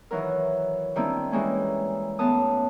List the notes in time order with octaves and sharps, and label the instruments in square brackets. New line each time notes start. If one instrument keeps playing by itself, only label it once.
[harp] D#3 E3 F#3 A#4
D#3 G3 A#3 C4 D4 E4
E3 G3 G#3 A#3 C#4
F#2 A2 B3 A5 D#6